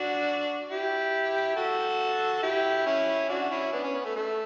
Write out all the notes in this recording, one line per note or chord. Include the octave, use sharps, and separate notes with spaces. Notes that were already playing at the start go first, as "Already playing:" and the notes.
Already playing: D4 F#4
E4 G4
F#4 A4
E4 G4
C#4 E4
D4 F#4
C#4 E4
B3 D4
C#4
B3
A3
A3